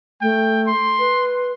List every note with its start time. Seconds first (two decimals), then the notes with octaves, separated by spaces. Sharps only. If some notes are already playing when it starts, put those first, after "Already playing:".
0.21 A3 G5
0.67 C6
0.99 B4